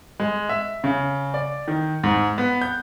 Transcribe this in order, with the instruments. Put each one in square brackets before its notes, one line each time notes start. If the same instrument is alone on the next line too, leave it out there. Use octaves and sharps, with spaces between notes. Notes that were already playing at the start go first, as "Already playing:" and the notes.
[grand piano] G#3
E5
C#3
D5
D#3
G#2
B3
G6